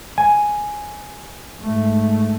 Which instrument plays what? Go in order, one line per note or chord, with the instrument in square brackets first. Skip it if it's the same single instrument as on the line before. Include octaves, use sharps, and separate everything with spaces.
[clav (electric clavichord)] G#5
[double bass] G#2 A3